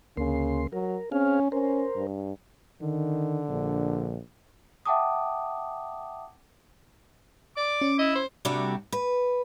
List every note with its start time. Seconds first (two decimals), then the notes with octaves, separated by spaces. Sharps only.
0.17 D2 C#3 A#3 C6
0.73 F#3 A#4
1.12 C4 C#4 G#4 F5
1.52 C#4 A#4 C5
1.96 G2
2.82 D3 D#3
3.49 A#1
4.86 E5 F#5 G5 A5 D6 D#6
7.57 D5 D6
7.81 C#4
7.99 E4 D#5
8.15 C5
8.45 C3 G3 A3 D4 F#4
8.92 B4